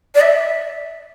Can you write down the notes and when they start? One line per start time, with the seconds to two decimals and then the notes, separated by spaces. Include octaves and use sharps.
0.15 D5
0.21 E5